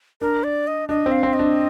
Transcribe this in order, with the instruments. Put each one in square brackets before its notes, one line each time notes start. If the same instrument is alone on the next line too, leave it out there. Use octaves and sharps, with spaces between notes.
[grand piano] D4 [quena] A#4
[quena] D5
D#5
[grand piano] D4 [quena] D#5
[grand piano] C4
[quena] F5
[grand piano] C4
[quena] D#5
[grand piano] D4